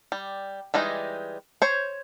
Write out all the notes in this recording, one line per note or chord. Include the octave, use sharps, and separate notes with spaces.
G3
E3 G3 G#3 D#4
C5 C#5